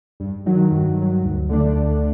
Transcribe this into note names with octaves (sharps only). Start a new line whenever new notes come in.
G2
D#3 F#3
G2
D#3 F#3
D2
D3 A3 D4
D2